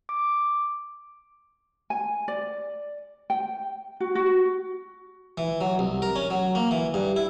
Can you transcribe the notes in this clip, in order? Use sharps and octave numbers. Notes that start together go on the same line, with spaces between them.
D6
G#5
D5
G5
F#4
F#4
E3
F#3
C2
A#4
C#4
F#3
A#3
E3
G2
E4